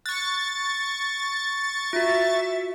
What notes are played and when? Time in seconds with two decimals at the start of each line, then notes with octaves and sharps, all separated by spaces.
0.06 C#6 F#6 A6
1.93 F4 F#4 E5